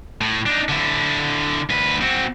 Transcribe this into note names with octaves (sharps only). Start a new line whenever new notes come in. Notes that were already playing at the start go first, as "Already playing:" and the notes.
A2
D4 D#4
D3 E4
D2 B4
C4 F#4